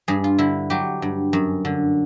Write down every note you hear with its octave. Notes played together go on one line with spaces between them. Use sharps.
G2 G#4
F4
D3 E4
F#3 G4
G2
F#2
D3